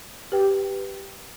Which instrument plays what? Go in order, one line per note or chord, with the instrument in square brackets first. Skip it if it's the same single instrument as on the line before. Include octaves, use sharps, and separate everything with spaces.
[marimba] G4 B4 G5